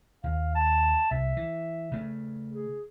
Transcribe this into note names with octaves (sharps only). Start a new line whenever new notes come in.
D#2 F5
A5
C2 E5
E3
C#3 A3
G#4